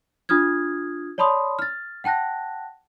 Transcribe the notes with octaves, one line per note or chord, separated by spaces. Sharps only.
D4 F4 D#6 F6 G#6
C#5 D5 A5 B5 C6 D#6
F6 A6
F#5 G5 A5 F#6 A#6